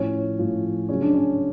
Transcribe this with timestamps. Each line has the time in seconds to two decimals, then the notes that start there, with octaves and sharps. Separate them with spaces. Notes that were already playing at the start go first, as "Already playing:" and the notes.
Already playing: A2 F3 C#4
0.39 A2 F3
0.89 C#3 F#3 C#4
1.02 D4
1.14 C#4